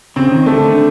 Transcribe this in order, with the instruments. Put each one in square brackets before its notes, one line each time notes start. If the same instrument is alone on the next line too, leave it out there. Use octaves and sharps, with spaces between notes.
[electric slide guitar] C#3 [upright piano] C4
[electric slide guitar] D#3
[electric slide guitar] D3 [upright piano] A3
[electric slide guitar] D3